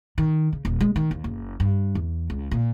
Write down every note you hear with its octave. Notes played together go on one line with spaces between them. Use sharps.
D#3
C#3
D#1
G#3
D#3
D#2
F#1
G2
E2
C#2
A#2